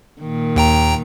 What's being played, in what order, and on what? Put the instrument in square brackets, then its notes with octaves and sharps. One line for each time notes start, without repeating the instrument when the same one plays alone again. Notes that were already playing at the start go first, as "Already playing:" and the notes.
[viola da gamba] A#2 D#3
[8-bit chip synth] D#2 G5 A#5